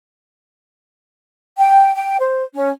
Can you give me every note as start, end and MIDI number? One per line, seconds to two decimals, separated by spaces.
1.57 1.92 79
1.94 2.16 79
2.19 2.44 72
2.54 2.68 61